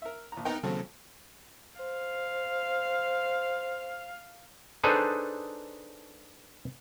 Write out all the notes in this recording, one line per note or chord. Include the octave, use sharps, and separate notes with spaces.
A#4 E5
A#1 A#5
B3 D#4 A#4 G5
D#2 C#3 F#3 C4 A4
C5 F5
D4 D#4 G#4 A4 B4 C5